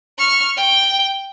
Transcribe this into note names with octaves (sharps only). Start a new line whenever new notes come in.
C#6 F6
G5